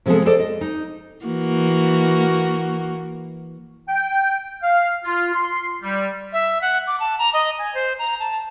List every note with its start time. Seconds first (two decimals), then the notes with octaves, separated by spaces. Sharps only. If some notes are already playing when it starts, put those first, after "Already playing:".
0.06 C3 F3 G#3 B3 G#4 A4
0.25 G#4 A4 C5 D5 D#5
0.40 D#5
0.61 D#4
1.25 E3 A#3 F#4
3.88 G5
4.63 F5
5.05 F4
5.34 C6
5.82 G3
6.33 E5
6.62 F#5
6.87 D6
7.00 A5
7.19 A#5
7.34 D#5
7.59 G#5
7.75 C5
7.99 A#5
8.20 A5